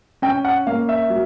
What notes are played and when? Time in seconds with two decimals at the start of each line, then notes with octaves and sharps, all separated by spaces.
0.22 C#4 G5
0.45 F#5
0.67 A#3 F5
0.89 E5
1.10 F#3